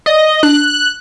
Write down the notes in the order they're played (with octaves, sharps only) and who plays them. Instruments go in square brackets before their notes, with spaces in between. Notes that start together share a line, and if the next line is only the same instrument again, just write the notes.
[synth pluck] D5 [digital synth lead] D#5
[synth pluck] D4 [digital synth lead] F#6